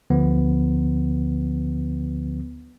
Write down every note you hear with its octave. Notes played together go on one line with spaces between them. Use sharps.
D2 D3 F3 B3